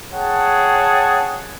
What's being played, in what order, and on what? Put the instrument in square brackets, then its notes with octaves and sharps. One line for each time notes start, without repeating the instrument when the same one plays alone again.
[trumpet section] G#4 C#5 F#5 G5 A5